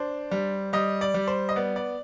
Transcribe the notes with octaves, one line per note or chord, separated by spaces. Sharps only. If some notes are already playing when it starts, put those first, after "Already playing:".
Already playing: D4 C5
G3
G3 D#5
D5
G3
C5
D#5
B3 D5
D5